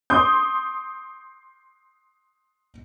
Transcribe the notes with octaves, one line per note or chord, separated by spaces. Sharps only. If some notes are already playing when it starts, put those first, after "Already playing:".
C6 D6 D#6 G6